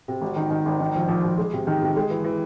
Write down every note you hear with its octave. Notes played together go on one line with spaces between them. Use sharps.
C3
G#1
D#3
D#3
G#1
D#3
A#1
A#1
A#1
G#3
C3
D#3
C3
G#3
E3
E3